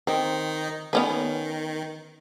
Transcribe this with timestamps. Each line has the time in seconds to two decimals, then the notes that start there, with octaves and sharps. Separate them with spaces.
0.07 D#3 C4 D#4
0.93 D#3 B3 C#4 B4